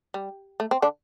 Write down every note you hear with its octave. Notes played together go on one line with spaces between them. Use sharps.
G3
A3
C4
D3 D4